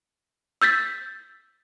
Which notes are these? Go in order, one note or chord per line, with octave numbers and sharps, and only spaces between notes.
E6 G6 A6 B6